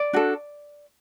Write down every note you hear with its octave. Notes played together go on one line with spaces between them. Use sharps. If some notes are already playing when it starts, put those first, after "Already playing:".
Already playing: D5
D4 F#4 A4